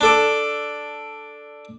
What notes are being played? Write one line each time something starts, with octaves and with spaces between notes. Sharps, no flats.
D4 A4 D5